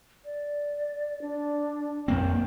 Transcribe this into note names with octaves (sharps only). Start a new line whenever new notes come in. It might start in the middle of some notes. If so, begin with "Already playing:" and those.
D5
D4
F2 A#3 C4 G5